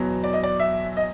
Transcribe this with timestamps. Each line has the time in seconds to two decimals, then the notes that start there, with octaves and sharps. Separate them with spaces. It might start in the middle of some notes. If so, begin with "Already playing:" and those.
Already playing: E2 B2 F#3
0.24 D5
0.33 D#5
0.43 D5
0.60 E5
0.97 D#5